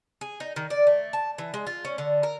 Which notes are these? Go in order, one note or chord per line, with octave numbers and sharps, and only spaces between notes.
G#4
D#4
D#3
D5
A3
A5
E3
G#3
F4
C#4
D3
A#4